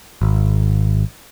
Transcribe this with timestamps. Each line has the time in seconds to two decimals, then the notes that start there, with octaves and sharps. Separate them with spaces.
0.22 G#1